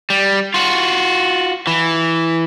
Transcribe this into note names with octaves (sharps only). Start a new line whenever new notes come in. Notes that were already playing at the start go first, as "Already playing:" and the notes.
G3
F4 F#4
E3